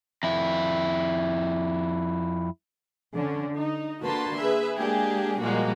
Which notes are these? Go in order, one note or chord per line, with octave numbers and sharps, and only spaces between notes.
F2 E4
D3 C#4
D#4
D3 A#3 F#4 B4 A5 C6
G#4 B4 E5
G#3 A#3 D4 G4 G#4
A#2 F3 G3 G#3 A#3 F#4